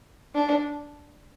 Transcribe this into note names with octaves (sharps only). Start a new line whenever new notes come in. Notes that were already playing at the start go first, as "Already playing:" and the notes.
D4